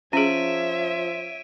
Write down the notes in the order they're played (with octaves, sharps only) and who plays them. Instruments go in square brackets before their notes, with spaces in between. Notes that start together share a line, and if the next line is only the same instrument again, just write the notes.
[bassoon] F3 [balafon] C#4 G#4 [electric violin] C#5 E5 [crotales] D7 D#7